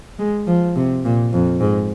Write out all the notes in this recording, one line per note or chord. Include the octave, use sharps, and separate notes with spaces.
G#3
F3
C3
A#2
F2
G#2